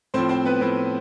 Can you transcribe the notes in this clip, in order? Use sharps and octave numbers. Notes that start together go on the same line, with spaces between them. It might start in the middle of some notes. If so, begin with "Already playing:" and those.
A2 F3 C4 C5
C4 C5
B3 B4
A2 F3 C4 C5